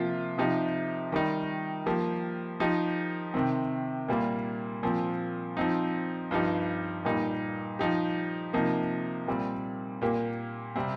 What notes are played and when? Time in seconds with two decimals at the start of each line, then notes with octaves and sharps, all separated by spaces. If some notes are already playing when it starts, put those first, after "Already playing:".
Already playing: C3 F3 A#3 F4
0.38 C3 F3 D#4 G4
1.12 D#3 G3 D#4
1.86 F3 A#3 G4
2.60 F3 D#4 G4
3.34 C3 D#3 C4
4.08 A#2 G3 A#3 F4
4.83 A#2 F3 C4
5.57 F3 C4 D#4
6.31 G2 F3 D#4 G4
7.05 A#2 G3 D#4 G4
7.79 F3 D#4 G4
8.53 C3 F3 A#3 D#4
9.28 A#2 G3 C4
10.02 A#2 A#3 G4
10.76 C3 G3 C4